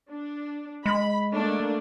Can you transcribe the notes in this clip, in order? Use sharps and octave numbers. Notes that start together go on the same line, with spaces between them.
D4
G#3 B5
A3 A#3 D4